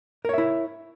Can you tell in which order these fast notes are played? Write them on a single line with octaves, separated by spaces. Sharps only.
A#4 C#5 E5 E4